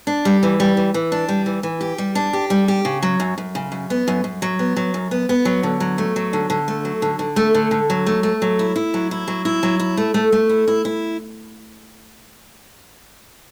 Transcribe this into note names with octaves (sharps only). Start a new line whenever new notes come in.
D4
G3
E3
G3
E3
E3
D4
G3
E3
E3
G4
G3
D4
G4
G3
G4
C#3
F#3
F#2
F#2
C#3
F#2
B3
F#2
F#2
F#3
B3
F#3
F#2
B3
B3
F#3
D3
F#3
A3
F#3
D3
D3
A3
F#3
D3
D3
A3
D3
D3
F#3
A3
A3
F#3
E4
E4
F#3
E4
F#3
E4
F#3
E4
A3
A3
A3
E4
E4
E4